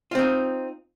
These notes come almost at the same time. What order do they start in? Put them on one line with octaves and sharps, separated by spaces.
F4 C4 D#4